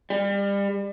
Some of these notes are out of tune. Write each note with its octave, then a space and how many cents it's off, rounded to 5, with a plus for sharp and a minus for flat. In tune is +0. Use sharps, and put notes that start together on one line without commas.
G3 +30